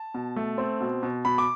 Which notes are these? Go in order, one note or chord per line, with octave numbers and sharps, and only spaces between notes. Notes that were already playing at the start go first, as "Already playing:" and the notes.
Already playing: A5
B2
A3
C4
B2
B2
B2 B5
D6